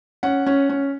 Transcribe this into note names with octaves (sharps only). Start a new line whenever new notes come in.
C#4 F#5
C#4
C#4